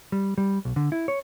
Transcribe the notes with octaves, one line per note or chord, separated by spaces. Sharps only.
G3
G3
B1
D3
E4
C#5